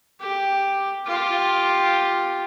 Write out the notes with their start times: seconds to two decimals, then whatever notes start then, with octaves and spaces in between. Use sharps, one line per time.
0.21 G4
1.06 F4 G4